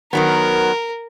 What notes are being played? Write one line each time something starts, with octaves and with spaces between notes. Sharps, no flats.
D#3 F#3 B3 A#4